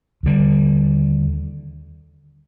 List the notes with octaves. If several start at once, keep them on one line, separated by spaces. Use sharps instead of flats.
D#2 D3 G3